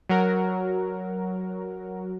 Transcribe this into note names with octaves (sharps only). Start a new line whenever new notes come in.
F#3 F#4 A#4